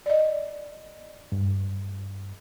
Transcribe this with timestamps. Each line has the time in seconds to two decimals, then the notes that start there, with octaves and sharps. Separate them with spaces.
0.06 D5 D#5
1.32 G2